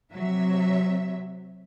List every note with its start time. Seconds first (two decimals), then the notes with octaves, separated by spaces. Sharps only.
0.13 C3 F#3 E5